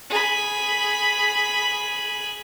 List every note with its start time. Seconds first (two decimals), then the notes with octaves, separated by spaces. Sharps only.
0.10 G#4 B5